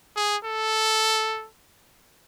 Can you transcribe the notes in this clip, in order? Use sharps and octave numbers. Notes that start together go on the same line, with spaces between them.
G#4
A4